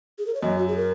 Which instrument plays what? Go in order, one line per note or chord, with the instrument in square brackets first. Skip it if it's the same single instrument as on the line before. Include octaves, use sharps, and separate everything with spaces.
[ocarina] G#4
A#4
C#5
[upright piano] F#2 [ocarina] D#5
[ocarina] F#4
G#4
A#4